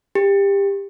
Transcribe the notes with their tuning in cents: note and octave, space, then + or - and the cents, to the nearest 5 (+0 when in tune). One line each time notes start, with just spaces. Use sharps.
G4 +25